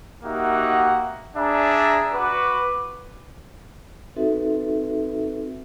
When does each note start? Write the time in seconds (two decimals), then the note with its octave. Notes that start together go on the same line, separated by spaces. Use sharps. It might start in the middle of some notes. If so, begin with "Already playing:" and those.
0.24 A#3 D#4 F#4 G4 E5 F#5
1.37 D4 G#4 D5 E5 A#5
2.13 F#4 B4 D6
4.16 C4 D#4 F#4 A4 B4 E5